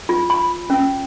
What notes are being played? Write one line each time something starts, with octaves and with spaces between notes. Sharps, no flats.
F4
B5
C#4